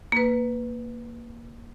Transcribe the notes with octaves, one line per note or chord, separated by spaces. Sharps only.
A#3 B4